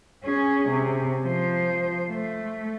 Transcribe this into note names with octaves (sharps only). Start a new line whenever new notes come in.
C#4 G#4
C3
F3 C5
A3